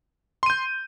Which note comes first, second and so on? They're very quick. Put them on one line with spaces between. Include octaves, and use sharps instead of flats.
C6 D#7 G6